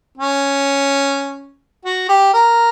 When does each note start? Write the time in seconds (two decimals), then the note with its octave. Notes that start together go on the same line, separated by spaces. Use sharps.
0.18 C#4
1.85 F#4
2.09 G4
2.33 A#4